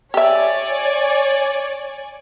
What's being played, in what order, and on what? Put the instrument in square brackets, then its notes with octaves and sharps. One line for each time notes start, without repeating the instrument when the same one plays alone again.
[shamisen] G4 E5 [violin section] C#5 D5 G#5